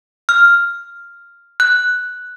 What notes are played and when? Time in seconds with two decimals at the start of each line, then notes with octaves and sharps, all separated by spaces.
0.29 F6
1.60 F#6